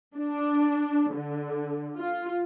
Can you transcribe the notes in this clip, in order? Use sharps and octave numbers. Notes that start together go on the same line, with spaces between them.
D4
D3
F4